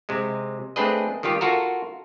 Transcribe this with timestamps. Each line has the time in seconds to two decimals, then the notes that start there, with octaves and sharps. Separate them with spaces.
0.09 C3 G#3
0.76 A3 C4 D4 G#4 B4 D#5
1.23 D#3 G3 F4 G4
1.41 F4 F#4 A4 A#4